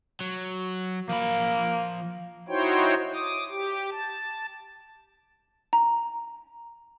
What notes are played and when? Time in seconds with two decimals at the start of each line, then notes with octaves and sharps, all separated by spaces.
0.21 F#3
1.09 F3 A#3 B5
2.48 D#4 E4 F#4 C5 C#5 G5
3.14 D6 D#6
3.50 G4 D6
3.91 A5
5.73 A#5